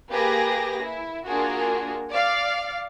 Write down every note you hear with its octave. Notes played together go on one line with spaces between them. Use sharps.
A#3 G4 G#4 B4 A#6
E4
A#3 D4 F4 F#4 G#4 A#4
D5 F5